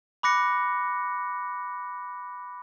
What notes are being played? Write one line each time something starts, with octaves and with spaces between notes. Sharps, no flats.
B5 D6 F#6 A#6 C#7